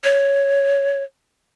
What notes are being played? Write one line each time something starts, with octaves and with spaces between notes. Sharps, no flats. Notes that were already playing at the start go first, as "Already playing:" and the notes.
C#5